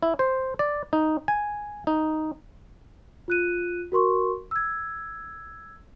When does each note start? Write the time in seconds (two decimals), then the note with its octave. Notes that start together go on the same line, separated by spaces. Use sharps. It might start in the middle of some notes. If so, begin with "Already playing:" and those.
0.03 E4
0.19 C5
0.59 D5
0.93 D#4
1.28 G#5
1.87 D#4
3.28 F4 F#6 D#7
3.92 F#4 A#4 C6 C#6
4.51 E6 G#6